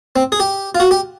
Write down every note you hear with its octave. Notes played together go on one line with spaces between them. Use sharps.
C4
G#4
G4
F4
F#4
G4